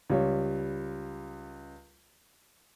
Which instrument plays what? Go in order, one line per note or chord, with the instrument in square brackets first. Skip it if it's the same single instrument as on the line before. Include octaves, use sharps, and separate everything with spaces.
[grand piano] C#2 G3 C#5